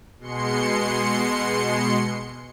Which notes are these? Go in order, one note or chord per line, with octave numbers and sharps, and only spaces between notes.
B2 G#3 C6 C#7